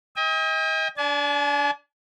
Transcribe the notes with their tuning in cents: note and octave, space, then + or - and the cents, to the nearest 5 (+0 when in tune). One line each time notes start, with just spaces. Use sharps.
D#5 +35 G5 +45
D4 -20 G#5 +45